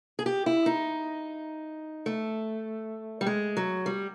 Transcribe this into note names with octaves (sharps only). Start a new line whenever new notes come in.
G#4
G4
E4
D#4
A3
G3
G#3
F#3
G3